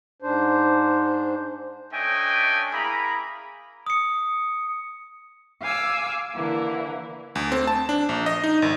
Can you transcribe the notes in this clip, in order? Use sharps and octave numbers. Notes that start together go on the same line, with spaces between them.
G#2 D4 C5
A3 C#4 D4 D#5 G5 G#5
A#3 E4 G#4 A#5 B5
D#6 C#7
F5 G#5 D6 E6
D3 E3 A#3 E4
D2
C4
A5
D4
A#1
D#5
D#4
G#1